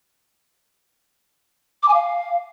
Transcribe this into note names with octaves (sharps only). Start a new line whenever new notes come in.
D6
G#5
F5